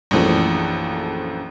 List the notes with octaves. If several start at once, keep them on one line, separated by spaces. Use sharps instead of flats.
A#1 F#2 E3 F3 A3